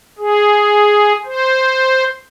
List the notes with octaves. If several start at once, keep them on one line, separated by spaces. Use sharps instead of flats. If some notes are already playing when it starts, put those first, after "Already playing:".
G#4
C5